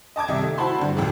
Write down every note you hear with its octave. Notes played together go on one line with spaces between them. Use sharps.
D#5 A5 D6 G#6
C2 D#3 G3 D#5 E5
A3
E4 F#4 C5 A5 B5 C6
G2 D3
A1 D#2 D3 E3 F#3 G#3